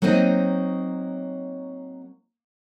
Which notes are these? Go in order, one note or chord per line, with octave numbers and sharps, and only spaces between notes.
F#3 A#3 C4 D#4 D#5